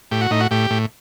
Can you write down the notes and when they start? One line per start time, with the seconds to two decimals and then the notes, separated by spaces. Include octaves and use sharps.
0.11 A2 G4
0.21 F#4
0.31 A2 D#4
0.40 F#4
0.51 A2 G4
0.70 A2